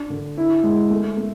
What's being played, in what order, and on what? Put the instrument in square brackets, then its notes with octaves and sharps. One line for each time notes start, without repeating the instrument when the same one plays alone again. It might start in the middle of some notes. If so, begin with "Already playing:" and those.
Already playing: [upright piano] D4
D3
E4
G#3
A3
A3